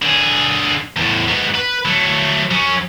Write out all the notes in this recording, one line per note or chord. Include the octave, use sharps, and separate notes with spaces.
D3 G#4
E2 A2
G#2 B3
B4
F#3 A3
F#3 C#4